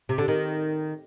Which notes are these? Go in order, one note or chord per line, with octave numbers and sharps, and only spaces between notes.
C3
D3
D#3